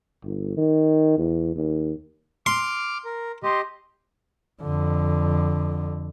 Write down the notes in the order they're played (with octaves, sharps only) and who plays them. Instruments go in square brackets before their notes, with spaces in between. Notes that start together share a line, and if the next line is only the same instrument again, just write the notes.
[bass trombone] G1
D#3
E2
D#2
[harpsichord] C6 [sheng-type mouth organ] D6 F6
[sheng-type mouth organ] A#4
[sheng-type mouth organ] G4 D#5 [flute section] C6
[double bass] F2 D3